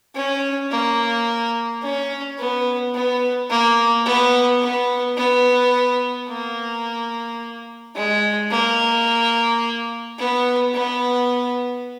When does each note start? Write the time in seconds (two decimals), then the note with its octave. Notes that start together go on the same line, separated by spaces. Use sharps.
0.15 C#4
0.71 A#3
1.83 C#4
2.38 B3
2.94 B3
3.50 A#3
4.05 B3
4.61 B3
5.17 B3
6.28 A#3
7.95 G#3
8.51 A#3
10.18 B3
10.74 B3